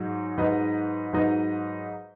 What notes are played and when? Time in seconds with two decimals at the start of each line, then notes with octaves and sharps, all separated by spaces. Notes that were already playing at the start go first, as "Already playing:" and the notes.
Already playing: G#2 F#3 D#4
0.37 G#2 F#3 D#4 B4 D#5
1.13 G#2 F#3 D#4 B4 D#5